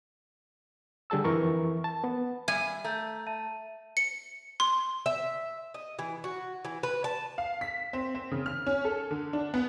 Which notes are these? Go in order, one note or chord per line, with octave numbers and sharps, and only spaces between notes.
D3 G3 G#4 A5 E6
F2 E3 A#4 C#6
A5
B3
G3 E5 G#5
A3 A#5 G6
E5 A5 D#7
C#7
C6
E5
D#5
E3
F#4
E3
B4
A5
F5
B6
C4
C4
C#3
F6
C#4
A4
D3
D4
B3